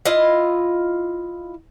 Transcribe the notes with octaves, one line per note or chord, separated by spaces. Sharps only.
E4 F4 D#5